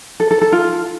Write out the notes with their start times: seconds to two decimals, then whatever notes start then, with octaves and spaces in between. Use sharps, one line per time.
0.20 A4
0.31 A4
0.42 A4
0.52 F4